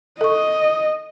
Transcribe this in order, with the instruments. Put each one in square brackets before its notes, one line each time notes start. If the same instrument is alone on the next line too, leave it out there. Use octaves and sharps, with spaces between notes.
[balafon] A4 C#6 [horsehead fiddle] D#5